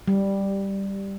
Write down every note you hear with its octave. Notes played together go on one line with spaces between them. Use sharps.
G3